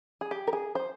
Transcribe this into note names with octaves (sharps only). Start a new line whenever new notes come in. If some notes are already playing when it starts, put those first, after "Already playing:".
G#4
G4
A#4
G#4
C5